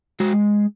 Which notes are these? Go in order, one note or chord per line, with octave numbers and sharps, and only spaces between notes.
G#3 F#4